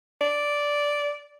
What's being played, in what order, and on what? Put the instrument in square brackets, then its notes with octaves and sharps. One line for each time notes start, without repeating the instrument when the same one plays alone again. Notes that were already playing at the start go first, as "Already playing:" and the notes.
[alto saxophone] D5